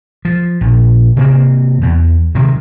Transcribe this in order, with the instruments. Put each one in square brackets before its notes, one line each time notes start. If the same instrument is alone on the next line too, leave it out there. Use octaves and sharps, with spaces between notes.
[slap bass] F3
A#1
C3 A#3 C4
E2
C3 D#3 F#3